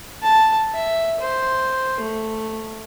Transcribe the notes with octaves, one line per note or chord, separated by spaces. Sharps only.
A5
E5
C5
A3